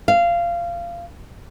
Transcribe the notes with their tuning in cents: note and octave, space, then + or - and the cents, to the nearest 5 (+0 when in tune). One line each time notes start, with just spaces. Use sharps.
F5 -20